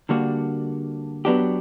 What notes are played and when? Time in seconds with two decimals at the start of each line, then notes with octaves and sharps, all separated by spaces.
0.09 D3 G3 A#3 D4 F#4
1.25 F#3 B3 D4 G4